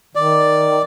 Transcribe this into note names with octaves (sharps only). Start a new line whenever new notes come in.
D#3 D5